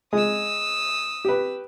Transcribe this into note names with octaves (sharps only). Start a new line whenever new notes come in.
G#3 D#6 E6
G4 B4